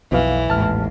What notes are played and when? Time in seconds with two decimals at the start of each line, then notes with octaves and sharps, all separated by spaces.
0.12 B1 F2 B2 E3 F5
0.50 A1 D#2 G#2 A5 F6